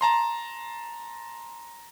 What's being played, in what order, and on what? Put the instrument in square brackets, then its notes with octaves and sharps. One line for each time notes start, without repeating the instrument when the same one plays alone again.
[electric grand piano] A5 A#5 C6